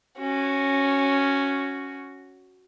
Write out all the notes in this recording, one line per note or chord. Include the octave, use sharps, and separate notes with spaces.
C#4 F#4